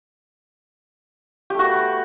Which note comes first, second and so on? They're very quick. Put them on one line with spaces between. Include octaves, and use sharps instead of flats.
G4 A3 F#4 B3